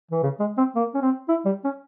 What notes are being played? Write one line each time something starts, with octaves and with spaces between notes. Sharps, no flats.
E3
C#3
G#3
C4
A#3
C#4
C4
E4
G3
C#4